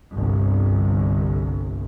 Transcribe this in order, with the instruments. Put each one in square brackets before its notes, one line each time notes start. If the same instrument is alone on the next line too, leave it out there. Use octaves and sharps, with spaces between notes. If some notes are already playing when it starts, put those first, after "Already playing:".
[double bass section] G1 C2